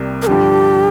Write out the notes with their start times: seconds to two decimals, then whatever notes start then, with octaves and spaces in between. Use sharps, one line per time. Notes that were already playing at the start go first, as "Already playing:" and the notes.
Already playing: C2 C3 G3 A#3
0.22 A#4
0.27 G2 D3 F3 G4